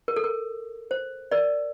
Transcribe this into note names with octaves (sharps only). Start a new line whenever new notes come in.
A#4
A4
A#4
C5
A#4 D5